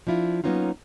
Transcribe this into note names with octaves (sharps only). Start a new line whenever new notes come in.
F3 D4 E4 F4
F#3 A#3 B3 C#4 D#4 F4